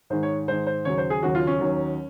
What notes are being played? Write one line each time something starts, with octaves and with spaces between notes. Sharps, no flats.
G#2 D#3 G#3 C5
C#5
G#2 D#3 G#3 C5
C5
D#2 C#3 F#3 C#5
C5
G#4
D#2 C#3 F#3 F#4
F4
C#4
D#2 D#3 F#3